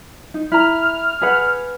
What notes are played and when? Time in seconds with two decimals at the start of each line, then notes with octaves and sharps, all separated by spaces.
0.34 D#4
0.52 E4 A#5 F6
1.21 G#4 B4 F#5